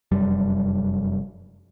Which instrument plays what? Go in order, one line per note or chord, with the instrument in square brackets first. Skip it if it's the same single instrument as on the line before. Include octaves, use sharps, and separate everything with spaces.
[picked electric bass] F1 F#2 G3